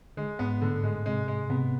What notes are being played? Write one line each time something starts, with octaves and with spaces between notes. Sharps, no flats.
D3 G#3
G#2 B3
A2 D3
A2 G#3
C3 G#3
G#3
C3 B3